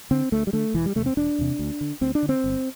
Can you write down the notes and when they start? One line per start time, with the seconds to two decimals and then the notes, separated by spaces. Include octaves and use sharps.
0.11 D3 C4
0.32 D2 A3
0.47 G3
0.53 D3 A3
0.74 E1 E3
0.86 G3
0.96 E2 C3 A3
1.06 C4
1.17 E1 D4
1.38 E2 C3
1.59 D2
1.81 D3
2.01 D2 C4
2.15 D4
2.23 D3
2.29 C4
2.44 G1